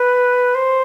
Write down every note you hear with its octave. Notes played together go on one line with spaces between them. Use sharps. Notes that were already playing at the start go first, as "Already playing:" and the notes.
Already playing: B4
C5